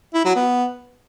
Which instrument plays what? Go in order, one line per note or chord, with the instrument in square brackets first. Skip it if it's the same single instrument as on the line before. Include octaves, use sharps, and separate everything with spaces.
[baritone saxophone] E4
F#3
B3